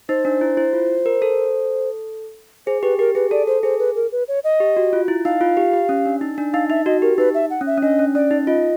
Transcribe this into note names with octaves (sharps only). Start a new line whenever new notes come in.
D#4 C5
D4
E4
E4
F4
A#4
A4
G#4 C5
G4 B4
G4 A#4
G#4 B4
A4 D5
A4 C5
G#4 C5
B4
A#4
B4
C#5
D#5
G4
F#4
F4
E4
D#4 F5
F4
G4
G4
C#4
D4
D#4
D4
D#4 F5
D#4 E5
F#4 D#5
G4 A#4
D#4 B4
E5
F#5
C#4
E5
C#4
D4 D#5
C#4
C#4 D5
D#4
F4 D#5